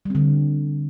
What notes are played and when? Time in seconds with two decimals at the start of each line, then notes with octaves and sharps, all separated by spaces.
0.05 G3
0.10 C4
0.15 D3